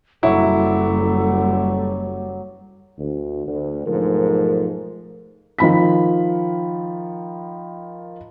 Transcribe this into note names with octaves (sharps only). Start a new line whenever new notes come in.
F#1 F#3 G3 E4 A4 D6
D2
D2
B1 G#2 F3 A3 A#4
D#3 F3 B5 B6